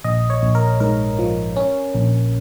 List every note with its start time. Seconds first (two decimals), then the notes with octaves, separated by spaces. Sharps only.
0.04 A#1 D#5
0.30 C#5
0.43 A#1
0.55 A#4
0.80 G#2 A#4
1.19 F3
1.56 C#4
1.95 A#1